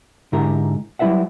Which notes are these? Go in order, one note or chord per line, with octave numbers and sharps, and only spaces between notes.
G#2 D3 E4 G4 A#4 A#5
F#3 G3 E4 B4 E5 F#5